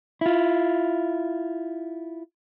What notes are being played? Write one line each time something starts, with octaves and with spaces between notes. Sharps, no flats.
E4 F4